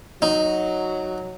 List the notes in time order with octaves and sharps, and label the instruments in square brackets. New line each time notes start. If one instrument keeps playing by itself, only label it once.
[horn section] F#3 [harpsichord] D#4